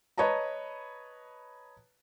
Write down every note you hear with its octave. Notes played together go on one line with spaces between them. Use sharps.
B4 C#5 D#5 A5 A#5